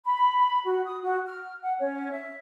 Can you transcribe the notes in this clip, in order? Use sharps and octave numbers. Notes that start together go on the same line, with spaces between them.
B5
F#4
D#6
F#4
F6
F#5
C#4
E5